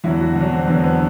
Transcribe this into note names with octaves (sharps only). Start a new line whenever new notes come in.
E2 D3 F#3 E4
F#4
E2 D3 F#3 D4
C4
E2 D3 F#3 B3
B3